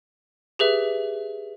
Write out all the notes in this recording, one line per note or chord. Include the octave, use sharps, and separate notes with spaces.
G4 G#4 B4 E5